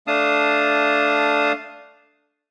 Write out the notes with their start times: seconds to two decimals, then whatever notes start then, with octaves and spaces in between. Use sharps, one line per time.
0.07 A3 D4 F5 A5 D#6